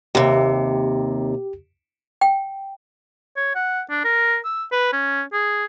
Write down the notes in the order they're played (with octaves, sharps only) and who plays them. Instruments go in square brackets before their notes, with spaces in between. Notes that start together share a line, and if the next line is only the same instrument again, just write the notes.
[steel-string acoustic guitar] D#2 C3 [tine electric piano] G4
[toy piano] G5
[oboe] C#5
F#5
D4
A#4
E6
B4
C#4
G#4